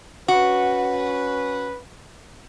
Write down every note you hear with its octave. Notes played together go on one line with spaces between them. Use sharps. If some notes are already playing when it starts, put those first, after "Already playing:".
C#4 F#4 B4